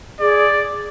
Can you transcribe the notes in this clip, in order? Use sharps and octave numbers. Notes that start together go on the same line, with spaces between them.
G#4 D5